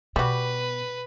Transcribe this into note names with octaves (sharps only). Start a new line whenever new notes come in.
B2 G3 F#4 B4